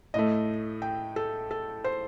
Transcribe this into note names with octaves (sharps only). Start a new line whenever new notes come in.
A2 A3 D#5
G5
A4
A4
C5